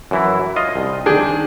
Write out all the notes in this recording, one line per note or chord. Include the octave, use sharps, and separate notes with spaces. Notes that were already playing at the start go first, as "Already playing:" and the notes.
F#2 E3 E4
F4 D#5
C2
D#3 D4 G#4 G5